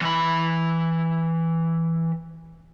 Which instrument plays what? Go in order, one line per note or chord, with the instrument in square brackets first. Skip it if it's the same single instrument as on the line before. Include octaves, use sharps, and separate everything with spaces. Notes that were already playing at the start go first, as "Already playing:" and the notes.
[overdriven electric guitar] E3 B5